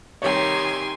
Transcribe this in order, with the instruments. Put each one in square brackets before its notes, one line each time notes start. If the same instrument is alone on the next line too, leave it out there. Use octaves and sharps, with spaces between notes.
[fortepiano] C2 C#5 [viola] D#3 [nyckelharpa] G4 [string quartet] G#5 C6